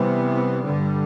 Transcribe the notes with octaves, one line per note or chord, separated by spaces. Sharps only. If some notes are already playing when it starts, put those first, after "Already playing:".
Already playing: C3 E3 G3 B3
G2 D3 G3